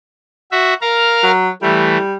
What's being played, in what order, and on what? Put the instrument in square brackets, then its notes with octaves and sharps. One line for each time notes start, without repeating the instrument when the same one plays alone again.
[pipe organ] F#4 E5
A#4 F5 A#5
[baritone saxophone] F#3
[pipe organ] E3 A3 [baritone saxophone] G3